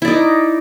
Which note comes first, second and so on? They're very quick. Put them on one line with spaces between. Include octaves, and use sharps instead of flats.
E4 D5 D#4